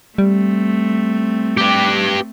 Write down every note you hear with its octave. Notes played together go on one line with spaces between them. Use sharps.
G3 A3 C4
G4 B4